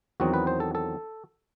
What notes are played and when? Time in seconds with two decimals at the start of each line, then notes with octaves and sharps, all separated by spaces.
0.20 E2 D#3 F#3 C4 D#4 F#4
0.34 B4
0.47 C5
0.60 A4
0.75 A4